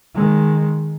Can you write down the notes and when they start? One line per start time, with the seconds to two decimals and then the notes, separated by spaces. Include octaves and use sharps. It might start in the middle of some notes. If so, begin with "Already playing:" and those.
0.15 D#3 G#3